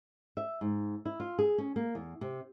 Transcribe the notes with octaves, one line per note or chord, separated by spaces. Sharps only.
E5
G#2
E4
F4
G#4
C#4
A#3
E2
C3